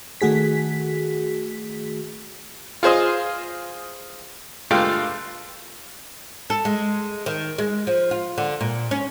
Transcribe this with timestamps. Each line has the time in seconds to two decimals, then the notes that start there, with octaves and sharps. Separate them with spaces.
0.21 D#3 A3 F#4 G#4 B6
2.83 F4 G#4 C5 D#5
4.71 G2 G#3 A3 F4 G5
6.50 A4
6.65 G#3
7.26 D#3
7.58 G#3
7.87 F3
8.11 F4
8.38 D3
8.61 A#2
8.91 C#4